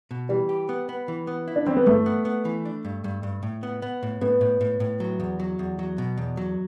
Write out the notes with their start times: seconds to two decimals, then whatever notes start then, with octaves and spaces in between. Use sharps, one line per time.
0.11 B2
0.29 E3 G3
0.49 G4
0.69 B3
0.89 B3
1.08 E3
1.27 B3
1.48 E4
1.56 D4
1.66 E3 C4
1.77 B3
1.86 G2 A3
2.06 B3
2.25 B3
2.45 E3
2.65 D4
2.85 G2
3.04 G2
3.23 G2
3.43 A2
3.63 B3
3.82 B3
4.03 A2
4.21 A2 B3
4.41 A2
4.61 A2
4.80 A2
5.00 F#3
5.20 E2
5.40 F#3
5.59 E2
5.79 F#3
5.98 B2
6.18 E2
6.37 F#3